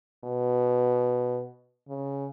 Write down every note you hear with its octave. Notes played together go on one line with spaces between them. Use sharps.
B2
C#3